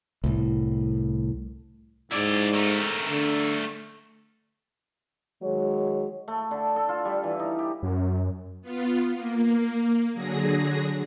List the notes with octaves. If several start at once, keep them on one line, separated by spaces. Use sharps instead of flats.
C2 A2
G#2 E4 D5
A3 A#4
D3
D#3 F#3 G#3 C#5
A3
D3
A4
F4
G3
E3
D#4
G4
F#2
B3 F4
A#3
D3 F#3 G#4 A#6